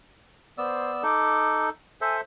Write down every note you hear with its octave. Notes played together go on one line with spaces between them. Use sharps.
B3 C5 D5 E6
D#4 A4 D6
A4 C5 E5 G#5